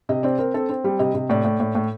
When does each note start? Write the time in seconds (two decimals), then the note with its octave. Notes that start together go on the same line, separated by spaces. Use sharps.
0.09 C3 D#5
0.23 C4 D5
0.39 C4 A#4
0.54 C4 A4
0.69 C4
0.84 G3
0.99 C3 D#5
1.14 C3
1.29 A2 D5
1.44 A2
1.60 A2
1.75 A2